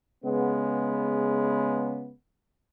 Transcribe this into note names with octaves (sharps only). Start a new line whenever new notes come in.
C#3 G#3 B3